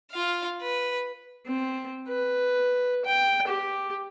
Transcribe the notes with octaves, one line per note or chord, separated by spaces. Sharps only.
F4 F5
B4
C4
B4
G5
G4